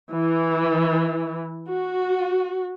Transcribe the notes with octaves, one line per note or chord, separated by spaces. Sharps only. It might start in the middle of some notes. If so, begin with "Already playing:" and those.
E3
F#4